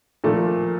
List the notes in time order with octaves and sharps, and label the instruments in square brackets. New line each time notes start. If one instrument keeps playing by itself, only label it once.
[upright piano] A#2 F3 A3